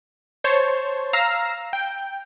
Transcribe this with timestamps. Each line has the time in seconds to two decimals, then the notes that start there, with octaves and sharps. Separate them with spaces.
0.44 C5 C#5 A5
1.13 F5 A#5 E6 F6 C7
1.73 G5